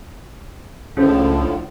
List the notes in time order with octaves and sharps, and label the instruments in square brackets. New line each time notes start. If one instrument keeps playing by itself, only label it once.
[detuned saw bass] C#2 [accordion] A2 D3 F3 [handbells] C#4 G#4 C5